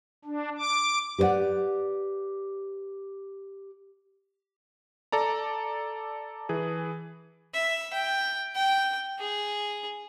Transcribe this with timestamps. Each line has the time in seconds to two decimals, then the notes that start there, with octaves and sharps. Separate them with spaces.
0.25 D4
0.58 D6
1.18 G4 B4 C5 D5 F#5
5.12 A4 D5 A#5
6.49 E3 G#4
7.54 E5
7.93 G5
8.55 G5
9.19 G#4